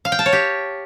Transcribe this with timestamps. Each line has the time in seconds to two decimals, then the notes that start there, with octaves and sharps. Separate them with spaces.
0.05 F5
0.12 G5
0.19 A5
0.26 C#5
0.33 G4